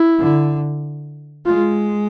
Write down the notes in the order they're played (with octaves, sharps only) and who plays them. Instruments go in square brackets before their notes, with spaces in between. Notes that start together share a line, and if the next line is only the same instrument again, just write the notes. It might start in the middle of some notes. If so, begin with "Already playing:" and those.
Already playing: [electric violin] E4
[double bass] D3
[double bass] G#3 [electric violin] F4